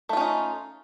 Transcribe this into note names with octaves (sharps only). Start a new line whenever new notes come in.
A3 C#4 D#4 F4